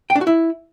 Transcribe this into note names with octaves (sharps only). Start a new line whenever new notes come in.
G5
D4
F#4
E4